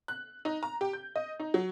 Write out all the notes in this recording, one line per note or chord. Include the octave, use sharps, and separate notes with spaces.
F#6
D#4
A#5
G4
G6
D#5
D#4
F#3